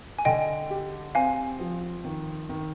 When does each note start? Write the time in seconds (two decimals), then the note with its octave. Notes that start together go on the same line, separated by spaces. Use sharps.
0.19 G#5
0.25 D3 D#5 G5
0.70 G4
1.15 C4 F5 G#5
1.60 F3
2.04 D#3
2.49 D#3